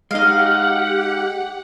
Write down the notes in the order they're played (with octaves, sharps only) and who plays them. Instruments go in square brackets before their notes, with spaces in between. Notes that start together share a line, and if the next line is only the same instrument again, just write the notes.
[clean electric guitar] G#3 D#4 [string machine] G4 F#5 [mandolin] D#5 F5